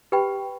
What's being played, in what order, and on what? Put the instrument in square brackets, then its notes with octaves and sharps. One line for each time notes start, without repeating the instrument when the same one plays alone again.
[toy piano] G4 B4 G5 B5